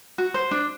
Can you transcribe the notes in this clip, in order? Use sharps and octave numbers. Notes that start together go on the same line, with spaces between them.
F#4
C5
D4